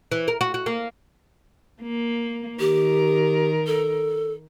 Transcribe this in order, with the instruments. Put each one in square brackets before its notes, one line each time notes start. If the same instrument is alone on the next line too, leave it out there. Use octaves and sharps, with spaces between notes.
[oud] E3
A#4
F#4
F#4
A#3
[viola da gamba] A#3
[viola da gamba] D#3 A#4 [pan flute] G4
[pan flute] A4